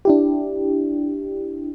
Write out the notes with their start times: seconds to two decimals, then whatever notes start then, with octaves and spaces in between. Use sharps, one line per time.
0.05 D4 E4 G4